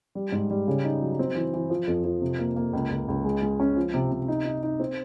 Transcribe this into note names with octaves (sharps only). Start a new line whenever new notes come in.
G3
G#2
G3
C#3
D#4
F#3
C4
E3
E3
F3
F2
F3
C3
A#3
A#3
C#2
C#2
C#2
G#3
G#3
C#4
F3
C3
C3
D#4
D#4
D#4
C4